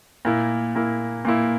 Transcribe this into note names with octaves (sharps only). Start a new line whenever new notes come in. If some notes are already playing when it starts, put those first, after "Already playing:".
A#2 A#3 E4
A#2 A#3 E4
A#2 A#3 E4